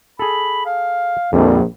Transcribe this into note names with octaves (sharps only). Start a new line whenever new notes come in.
G#4 A4 B5
F5
A#1 F2 D3 G3 C4